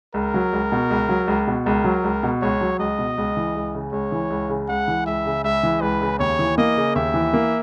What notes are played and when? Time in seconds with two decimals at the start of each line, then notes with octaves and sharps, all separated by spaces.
0.14 C#2 A#4
0.34 F#3
0.53 C#2
0.72 B2
0.90 C#2
1.09 F#3
1.28 C#2
1.47 B2
1.66 C#2 A#4
1.84 F#3
2.04 C#2
2.23 B2
2.42 C#2 C#5
2.61 F#3
2.79 C#2 D#5
2.99 B2
3.18 C#2
3.37 E3
3.55 C#2
3.74 C#3
3.92 C#2 C#5
4.12 E3
4.30 C#2
4.49 C#3
4.68 C#2 F#5
4.88 E3
5.06 C#2 E5
5.26 C#3
5.44 C#2 E5
5.63 E3
5.81 C#2 B4
6.01 C#3
6.19 D#2 C#5
6.39 E3
6.58 A#3 D#5
6.77 C#3
6.95 D#2 E5
7.14 E3
7.33 A#3